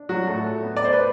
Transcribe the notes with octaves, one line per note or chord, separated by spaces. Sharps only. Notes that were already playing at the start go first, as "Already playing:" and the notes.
Already playing: D4
F#3 F#4
A2 A3 A4
B3
D5
C5
B4